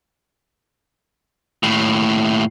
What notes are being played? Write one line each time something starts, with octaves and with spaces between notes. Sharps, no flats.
D#2 A2